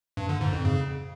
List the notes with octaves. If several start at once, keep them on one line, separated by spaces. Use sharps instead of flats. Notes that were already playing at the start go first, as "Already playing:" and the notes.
G2
D3
G#2
F2
C#3